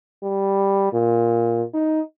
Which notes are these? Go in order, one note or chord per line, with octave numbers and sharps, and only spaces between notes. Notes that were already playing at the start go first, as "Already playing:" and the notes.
G3
A#2
D#4